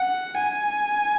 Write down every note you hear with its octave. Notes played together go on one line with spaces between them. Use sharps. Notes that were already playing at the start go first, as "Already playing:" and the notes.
Already playing: F#5
G#5